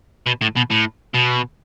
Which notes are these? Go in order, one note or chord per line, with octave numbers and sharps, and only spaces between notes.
B2
A2
B2
A2
B2